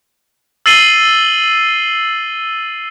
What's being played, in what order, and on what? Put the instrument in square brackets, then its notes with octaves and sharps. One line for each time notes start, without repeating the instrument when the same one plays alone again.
[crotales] E6 A6 C7 D#7 F#7 G7